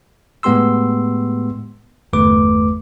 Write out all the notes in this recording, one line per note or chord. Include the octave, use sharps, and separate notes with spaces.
A2 G#3 B3 G4 C6 E6
G1 E2 A3 B4 D6